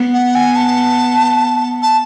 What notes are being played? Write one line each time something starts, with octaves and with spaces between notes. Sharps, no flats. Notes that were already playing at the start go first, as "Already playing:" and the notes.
Already playing: B3
F#5
G#5
A5
A5